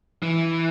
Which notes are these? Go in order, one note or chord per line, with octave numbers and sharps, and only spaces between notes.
E3